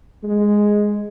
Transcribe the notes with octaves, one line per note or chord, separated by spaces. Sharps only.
G#3